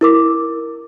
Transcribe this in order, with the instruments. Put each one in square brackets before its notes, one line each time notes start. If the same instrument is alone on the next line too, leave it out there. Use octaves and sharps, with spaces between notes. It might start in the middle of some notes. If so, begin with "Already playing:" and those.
[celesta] E4 A#4 D6